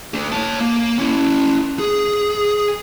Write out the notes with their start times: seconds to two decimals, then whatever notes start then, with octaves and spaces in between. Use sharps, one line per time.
0.14 A3 D4
0.32 C#5 A5
0.60 A#3
0.99 C#4 E4
1.79 G#4